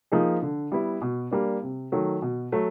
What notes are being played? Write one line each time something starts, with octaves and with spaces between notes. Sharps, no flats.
F3 A#3 D#4 G#4
D3
G3 B3 E4
B2
G3 A#3 D4
C3
D#3 F#3 A3
B2
F#3 A3